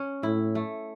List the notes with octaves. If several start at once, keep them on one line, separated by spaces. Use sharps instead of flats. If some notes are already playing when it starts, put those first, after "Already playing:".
Already playing: C#4
A2 E4
A3